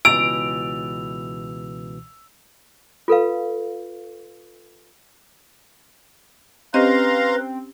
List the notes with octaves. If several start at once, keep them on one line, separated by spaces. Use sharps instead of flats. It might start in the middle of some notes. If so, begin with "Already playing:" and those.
C#2 B2 E3 E6 D7 F7
F4 A4 B4 F5
C4 C#4 G4 B4 D#5 F5 A#5 C6